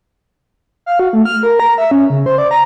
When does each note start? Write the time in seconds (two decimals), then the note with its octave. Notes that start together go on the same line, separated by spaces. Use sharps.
0.86 F5
1.00 F#4
1.13 A3
1.25 F6
1.43 A#4
1.60 A#5
1.78 E5
1.91 C#4
2.10 C#3
2.26 C5
2.38 D5
2.51 A#5